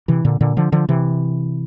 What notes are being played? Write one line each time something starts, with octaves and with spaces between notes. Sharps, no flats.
C3 E3
A#2 D3
A#2 D3
D3 F3
D3 F3
C3 E3